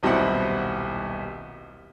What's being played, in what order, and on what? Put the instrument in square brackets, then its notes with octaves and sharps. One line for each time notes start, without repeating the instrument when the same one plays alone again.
[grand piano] D#1 B1 G3 C4 E4 F#5